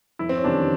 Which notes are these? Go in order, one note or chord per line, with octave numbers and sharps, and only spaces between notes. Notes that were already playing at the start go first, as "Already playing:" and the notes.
F1 E4
C4
C#4
E2 C3 D#3 G3 D4